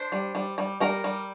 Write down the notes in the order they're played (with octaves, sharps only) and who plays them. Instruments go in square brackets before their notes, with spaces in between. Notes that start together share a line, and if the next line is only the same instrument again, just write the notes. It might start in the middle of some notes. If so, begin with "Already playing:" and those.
Already playing: [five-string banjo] D4 C5
G3
G3
G3
G3 A#4
G3